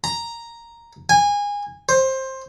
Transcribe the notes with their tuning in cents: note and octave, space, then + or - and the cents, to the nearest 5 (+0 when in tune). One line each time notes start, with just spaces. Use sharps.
A#5 +0
G#5 -25
C5 +15